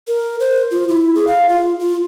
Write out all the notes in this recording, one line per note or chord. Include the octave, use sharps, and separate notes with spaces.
A#4
C5
F4
E4
G#4
F5
F4
F4